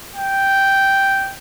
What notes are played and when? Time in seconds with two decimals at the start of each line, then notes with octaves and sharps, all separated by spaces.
0.15 G5